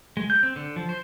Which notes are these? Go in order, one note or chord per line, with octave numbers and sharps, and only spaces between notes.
G#3
G6
C4
D3
F3
C5